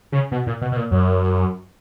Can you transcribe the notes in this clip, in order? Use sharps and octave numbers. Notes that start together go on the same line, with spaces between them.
C#3
B2
A#2
B2
B2
A#2
F#2